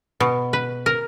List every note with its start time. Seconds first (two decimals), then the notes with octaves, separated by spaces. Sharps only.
0.20 B2
0.53 B4
0.86 A#4